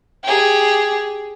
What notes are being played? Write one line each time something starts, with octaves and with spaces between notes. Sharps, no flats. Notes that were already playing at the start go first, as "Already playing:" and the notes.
G4 G#4